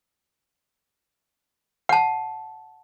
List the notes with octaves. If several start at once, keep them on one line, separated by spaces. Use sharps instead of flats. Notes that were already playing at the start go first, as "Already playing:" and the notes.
F#5 A5